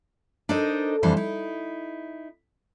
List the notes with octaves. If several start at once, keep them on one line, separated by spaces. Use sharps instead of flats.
D4 D#4 A4 A#4 C5 D#5
F2 D3 E3 G3 C5
D#4 E4